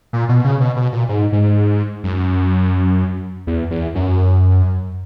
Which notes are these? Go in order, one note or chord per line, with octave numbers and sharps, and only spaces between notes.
A#2
B2
C#3
B2
B2
A#2
G#2
G#2
F#2
E2
E2
F#2